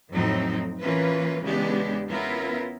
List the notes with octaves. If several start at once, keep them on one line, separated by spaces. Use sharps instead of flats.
F2 A2 F#3 C4 D#4
E3 A#3 C#4 F4 B4
E2 C#3 G#3 B3 D4 G4
B3 C#4 E4 F4 A#4